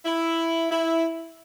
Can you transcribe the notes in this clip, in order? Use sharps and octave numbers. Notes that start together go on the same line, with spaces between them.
E4
E4